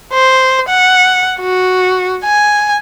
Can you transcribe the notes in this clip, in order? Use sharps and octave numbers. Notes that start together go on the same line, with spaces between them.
C5
F#5
F#4
G#5